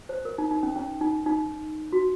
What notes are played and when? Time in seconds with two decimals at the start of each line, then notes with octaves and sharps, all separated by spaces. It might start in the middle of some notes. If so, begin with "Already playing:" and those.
0.09 C5
0.25 A#4
0.38 D#4
0.51 D#4
0.63 C#4
0.76 C#4
1.01 D#4
1.26 D#4
1.92 F#4